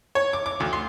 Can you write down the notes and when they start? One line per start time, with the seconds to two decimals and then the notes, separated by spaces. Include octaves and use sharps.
0.15 C#5
0.33 D6
0.46 D6
0.60 D2
0.73 C6